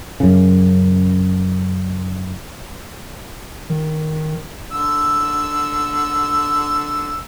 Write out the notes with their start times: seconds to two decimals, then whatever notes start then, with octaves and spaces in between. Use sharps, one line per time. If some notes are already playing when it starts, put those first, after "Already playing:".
0.20 F#2 C#3
3.70 D#3
4.72 D3 E6